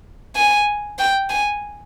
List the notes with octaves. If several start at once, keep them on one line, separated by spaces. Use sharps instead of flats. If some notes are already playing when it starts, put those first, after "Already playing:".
G#5
G5
G#5